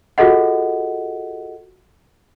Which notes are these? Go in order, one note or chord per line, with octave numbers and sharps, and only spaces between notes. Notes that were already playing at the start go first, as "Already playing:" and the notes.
F4 F#4 G#4 A4 D#5 F#5